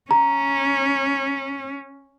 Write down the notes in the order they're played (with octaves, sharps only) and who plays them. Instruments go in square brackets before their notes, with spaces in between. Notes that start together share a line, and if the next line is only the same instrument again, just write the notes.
[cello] C#4 [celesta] A#5